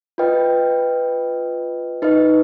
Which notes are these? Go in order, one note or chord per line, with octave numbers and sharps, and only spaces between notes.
F4 B4 D#5 G5
D#4 B4 D#5